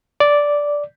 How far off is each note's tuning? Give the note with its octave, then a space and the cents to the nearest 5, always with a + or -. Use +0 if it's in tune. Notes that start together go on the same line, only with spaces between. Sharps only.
D5 -5